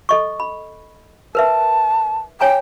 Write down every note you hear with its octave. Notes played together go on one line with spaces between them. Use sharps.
A4 D#5 C#6
B5
A#4 B4 E5 A5
C#5 G5 G#5 A#5